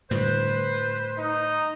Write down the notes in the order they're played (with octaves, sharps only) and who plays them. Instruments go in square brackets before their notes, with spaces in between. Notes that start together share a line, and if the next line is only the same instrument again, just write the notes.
[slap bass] A2 D3 G3 [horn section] B4 C5
[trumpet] D#4